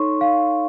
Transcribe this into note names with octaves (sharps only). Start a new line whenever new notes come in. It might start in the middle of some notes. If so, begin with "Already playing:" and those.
Already playing: D#4 A4 C#5 C6 C#6
F5